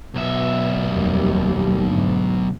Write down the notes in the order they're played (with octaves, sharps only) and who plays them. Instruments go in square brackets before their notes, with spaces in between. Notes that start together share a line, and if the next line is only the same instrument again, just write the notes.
[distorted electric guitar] B1 E5 [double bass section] B2
[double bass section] F1 D#2 G3
D2 G#2